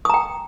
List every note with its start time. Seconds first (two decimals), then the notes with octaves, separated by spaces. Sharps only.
0.05 D#6
0.10 A#5
0.14 G5